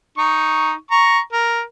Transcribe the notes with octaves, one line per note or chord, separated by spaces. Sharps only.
D#4 C#6
A#5 C#6
A#4